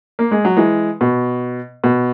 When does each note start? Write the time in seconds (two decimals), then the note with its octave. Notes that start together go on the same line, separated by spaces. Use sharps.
0.19 A#3
0.31 G#3
0.45 F#3
0.57 E3 G#3
1.01 B2
1.84 B2